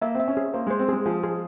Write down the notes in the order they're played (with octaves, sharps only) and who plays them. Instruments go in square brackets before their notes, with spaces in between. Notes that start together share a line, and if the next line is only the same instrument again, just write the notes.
[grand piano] A#3 [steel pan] E5
[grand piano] C4 [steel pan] E5
[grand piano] C#4
[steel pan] G#4
[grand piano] A#3 [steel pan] C5
[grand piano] G#3 [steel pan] C5
[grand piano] C4
[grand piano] G#3 [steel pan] G#4
[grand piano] F3 [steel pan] G#4
[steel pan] G#4